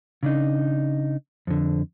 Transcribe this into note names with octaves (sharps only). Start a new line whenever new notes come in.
C#3 D4 D#4
F2 D3